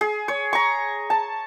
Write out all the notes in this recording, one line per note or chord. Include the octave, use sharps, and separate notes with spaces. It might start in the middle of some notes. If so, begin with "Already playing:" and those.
G#4
C#5
A#5 C#6
A5